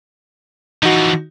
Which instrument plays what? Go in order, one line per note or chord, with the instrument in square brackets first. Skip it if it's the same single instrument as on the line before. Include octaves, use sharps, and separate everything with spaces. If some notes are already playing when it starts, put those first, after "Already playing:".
[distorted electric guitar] E3 F3 [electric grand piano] D#4 F#4